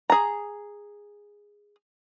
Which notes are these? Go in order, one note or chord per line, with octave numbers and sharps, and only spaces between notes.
G#4 A#5